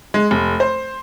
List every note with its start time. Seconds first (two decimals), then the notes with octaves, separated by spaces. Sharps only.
0.14 G#3
0.31 F1
0.60 C5